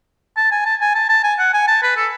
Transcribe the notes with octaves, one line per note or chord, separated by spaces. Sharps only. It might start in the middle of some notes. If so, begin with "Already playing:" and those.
A5
G#5
A5
G#5
A5
A5
G#5
F#5
G#5
A5
B4
A4